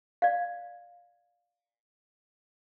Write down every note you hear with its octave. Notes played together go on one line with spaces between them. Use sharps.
D5 F5